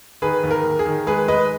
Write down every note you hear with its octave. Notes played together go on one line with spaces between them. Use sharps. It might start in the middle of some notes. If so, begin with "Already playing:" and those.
D#3 G#4 B4
D#2
A#4
D#2
G#4
D#3
G#3 G#4 B4
G#3 B4 D#5